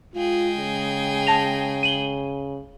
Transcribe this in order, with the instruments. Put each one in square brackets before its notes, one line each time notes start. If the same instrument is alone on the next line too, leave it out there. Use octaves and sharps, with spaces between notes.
[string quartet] G#3 G#4 G5 [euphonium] F4
[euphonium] C#3
[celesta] A5 A#6 F7
D#7 F#7 G7